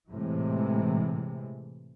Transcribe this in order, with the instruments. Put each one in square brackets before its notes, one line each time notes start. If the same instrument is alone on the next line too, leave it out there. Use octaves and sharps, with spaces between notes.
[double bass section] A2 C3 E3 G#3